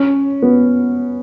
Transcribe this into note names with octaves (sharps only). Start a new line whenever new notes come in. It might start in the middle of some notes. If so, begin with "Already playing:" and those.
Already playing: C#4
B3